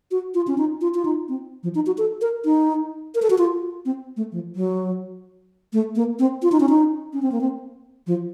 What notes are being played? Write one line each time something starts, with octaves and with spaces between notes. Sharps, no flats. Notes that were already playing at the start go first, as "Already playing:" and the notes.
F#4
F4
C#4
D#4
F4
F4
D#4
C4
F3
D#4
F#4
A4
A#4
D#4
A#4
A4
F#4
F4
C4
A3
F3
F#3
A3
A#3
C4
F4
D#4
C#4
D#4
C#4
C4
A#3
C4
F3